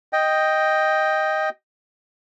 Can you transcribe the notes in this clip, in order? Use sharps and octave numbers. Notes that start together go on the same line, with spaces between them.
D#5 G5